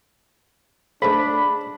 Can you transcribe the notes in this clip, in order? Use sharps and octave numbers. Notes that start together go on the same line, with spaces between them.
C#2 G#2 A3 D4 B5